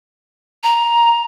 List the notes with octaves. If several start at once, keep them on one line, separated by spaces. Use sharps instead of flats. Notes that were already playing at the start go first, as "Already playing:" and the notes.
A#5